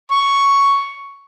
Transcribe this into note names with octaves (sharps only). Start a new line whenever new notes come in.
C#6